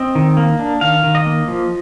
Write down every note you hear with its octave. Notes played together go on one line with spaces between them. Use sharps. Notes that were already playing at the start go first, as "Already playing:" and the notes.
Already playing: C4 D#5
D#3
A#3
D4
D#3 F5
D#3
D#5
A#3
F3